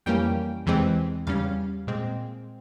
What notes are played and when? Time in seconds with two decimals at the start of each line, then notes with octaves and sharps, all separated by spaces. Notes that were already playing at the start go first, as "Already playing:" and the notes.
0.06 F2 E3 G3 A#3 C#4 G5
0.66 E2 C3 E3 G#3 C4
1.27 E2 C#3 G3 C#4 F5
1.87 A#2 G#3 C4